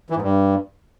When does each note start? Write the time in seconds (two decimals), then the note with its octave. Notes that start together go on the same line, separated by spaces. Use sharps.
0.10 E3
0.16 G#2
0.22 G2